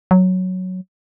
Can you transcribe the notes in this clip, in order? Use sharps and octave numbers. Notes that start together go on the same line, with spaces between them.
F#3